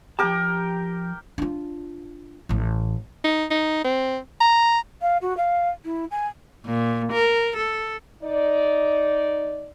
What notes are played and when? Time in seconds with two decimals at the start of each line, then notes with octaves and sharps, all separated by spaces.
0.19 F3 G4 A#4 G5 A5
1.38 D4 F4
2.49 A1 A2
3.24 D#4
3.51 D#4
3.84 C4
4.41 A#5
5.01 F5
5.21 F#4
5.37 F5
5.85 E4
6.11 G#5
6.65 A#2
7.12 A#4
7.57 A4
8.23 D#4 D5